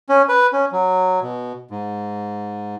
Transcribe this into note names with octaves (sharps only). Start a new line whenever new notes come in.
C#4
B4
C#4
F#3
B2
G#2